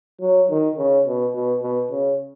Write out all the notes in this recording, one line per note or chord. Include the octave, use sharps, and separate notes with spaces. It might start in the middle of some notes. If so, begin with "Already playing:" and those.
F#3
D#3
C#3
B2
B2
B2
C#3